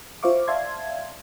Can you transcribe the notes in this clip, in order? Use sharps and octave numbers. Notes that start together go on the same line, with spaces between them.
F4 C5 E5 F5 C#6 D6
D5 E5 F5 A5 C6 G#6